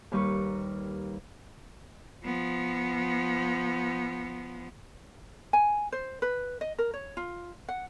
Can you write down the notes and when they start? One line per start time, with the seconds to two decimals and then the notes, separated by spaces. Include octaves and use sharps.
0.12 D#2 G3 A#4 B4 C#6
2.24 F3 B3
5.53 G#5
5.92 C5
6.22 B4
6.61 D#5
6.79 A#4
6.94 C#5
7.17 F4
7.69 F#5